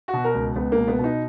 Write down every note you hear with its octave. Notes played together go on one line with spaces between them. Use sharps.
F#4
B2
A#4
C#2
C#2 B3
A#3
B2
B3
B2
D#4